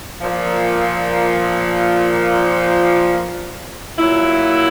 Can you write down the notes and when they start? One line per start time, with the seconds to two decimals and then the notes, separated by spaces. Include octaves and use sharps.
0.21 A#2 F3
3.98 A#2 F#3 E4